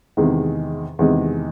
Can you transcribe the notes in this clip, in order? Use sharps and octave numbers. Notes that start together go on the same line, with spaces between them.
E2 C3 D#3 G#3
E2 C3 D#3 G#3